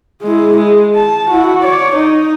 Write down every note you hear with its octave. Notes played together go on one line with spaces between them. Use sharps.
G#3 E4
G#3
A5
E4 F#4
C#5 D5
D#4